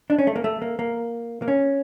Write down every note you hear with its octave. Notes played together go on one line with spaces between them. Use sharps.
D4
C#4
A3
A#3
A3
A#3
A#3
A#3
C#4